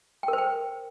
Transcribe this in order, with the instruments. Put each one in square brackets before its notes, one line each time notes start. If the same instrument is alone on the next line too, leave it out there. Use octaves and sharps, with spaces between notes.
[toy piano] G5
A#4
C5
G5